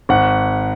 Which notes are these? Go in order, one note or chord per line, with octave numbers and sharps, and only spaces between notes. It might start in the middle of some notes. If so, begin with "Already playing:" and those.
G#1 F#5